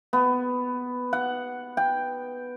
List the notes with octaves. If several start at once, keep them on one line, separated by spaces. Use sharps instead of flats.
B3
F#5
G5